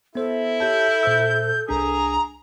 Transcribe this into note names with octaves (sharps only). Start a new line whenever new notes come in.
B3 E4 A4 C5
G4 C#5 A5 G6
A#2 C5 E6
C2 D4 G#4 A#5